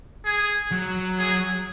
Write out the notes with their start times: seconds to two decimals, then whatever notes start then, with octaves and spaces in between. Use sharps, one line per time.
0.25 G#4
0.71 F#3
1.19 G#4